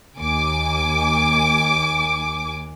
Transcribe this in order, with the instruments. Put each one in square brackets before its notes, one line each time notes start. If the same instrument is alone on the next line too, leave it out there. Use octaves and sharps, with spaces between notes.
[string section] D#2 G#5 D6